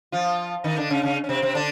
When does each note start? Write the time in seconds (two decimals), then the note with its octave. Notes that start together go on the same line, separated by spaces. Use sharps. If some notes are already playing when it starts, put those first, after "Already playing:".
0.12 F3 F4
0.64 D#3 D#4
0.78 D3 D4
0.90 C#3 C#4
1.03 C#3 C#4
1.24 C#4
1.29 C3 C4
1.42 C3 C4
1.55 D3 D4